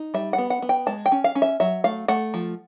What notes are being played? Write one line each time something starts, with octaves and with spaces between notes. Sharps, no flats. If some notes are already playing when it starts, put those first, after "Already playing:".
Already playing: D#4
G3 E5
F#5
B3
F#5
B3
G5
G#3 A5
G5
C#4
F5
C#4
E5
F#3 E5
A3 F5
A3 F#5
F3